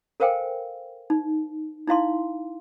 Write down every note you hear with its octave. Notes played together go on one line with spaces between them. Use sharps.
A4 A#4 C5 F5 G5 G#5
D#4
D#4 E4 F5 C6